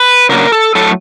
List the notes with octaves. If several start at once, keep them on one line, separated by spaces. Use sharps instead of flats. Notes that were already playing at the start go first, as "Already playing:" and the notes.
Already playing: B4
C#3 F#3 A#3 D4 A#4
A4
A2 F#3 A3 A4